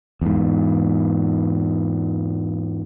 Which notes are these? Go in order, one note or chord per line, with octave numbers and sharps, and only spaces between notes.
E2 G#2